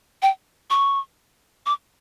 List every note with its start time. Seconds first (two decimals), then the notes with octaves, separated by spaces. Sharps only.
0.22 G5
0.70 C#6
1.66 D6